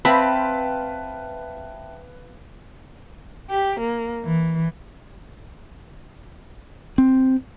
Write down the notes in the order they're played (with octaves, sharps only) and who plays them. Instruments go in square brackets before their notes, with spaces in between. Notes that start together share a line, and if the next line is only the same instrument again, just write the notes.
[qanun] C4 [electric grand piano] B4 F5 [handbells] E5 G5 A5 [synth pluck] B5
[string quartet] G4
A#3
E3
[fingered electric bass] C4